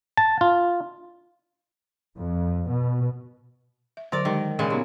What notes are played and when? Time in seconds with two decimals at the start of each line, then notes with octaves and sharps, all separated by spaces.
0.17 A5
0.41 F4
2.17 F2
2.69 B2
3.97 E5
4.12 D3 F#3 A#4 C5 D5
4.25 D#3 G#3 G4
4.59 A#2 C#3 G#3
4.70 F#3 B3 D#4 G4